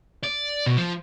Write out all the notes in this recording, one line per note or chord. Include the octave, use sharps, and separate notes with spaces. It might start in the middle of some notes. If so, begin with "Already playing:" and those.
D5
B2
F3